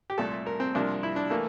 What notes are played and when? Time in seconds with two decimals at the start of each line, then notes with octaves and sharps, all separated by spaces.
0.10 G4
0.18 C2 A#2 A3 A4
0.46 A#4
0.60 C4
0.75 C2 C3 F3 A#3 D4
1.03 E4
1.16 D4
1.30 E3 A3 A#3